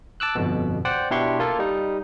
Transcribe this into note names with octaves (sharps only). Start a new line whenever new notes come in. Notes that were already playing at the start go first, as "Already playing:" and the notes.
A5 D6 E6 F#6
G1 F2 B2
C5 D5 F#5 G5
B2 D4 E4 G4 C6 C#6
A#3 F4 A4
G3 D#4